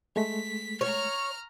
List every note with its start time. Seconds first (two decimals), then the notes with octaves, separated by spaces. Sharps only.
0.16 G#3 A3 B6
0.81 C#5 A#5 F6